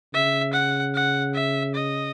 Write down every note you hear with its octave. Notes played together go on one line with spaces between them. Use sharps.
C#3 E5
F#5
F#5
E5
D#5